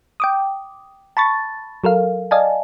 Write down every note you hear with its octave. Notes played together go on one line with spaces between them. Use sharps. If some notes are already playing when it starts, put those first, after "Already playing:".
G5 D6 D#6
A5 B5 C#6 A6
F#3 A4 A#4 F5
D5 D#5 F5 G#5 A5